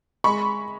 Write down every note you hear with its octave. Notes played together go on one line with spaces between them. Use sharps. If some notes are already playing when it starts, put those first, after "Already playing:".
G#3 B5 C#6